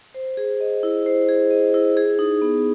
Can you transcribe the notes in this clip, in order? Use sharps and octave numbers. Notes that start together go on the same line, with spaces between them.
C5
G#4
D#5
E4
C5
G#4
D#5
E4
G#4
D#4
B3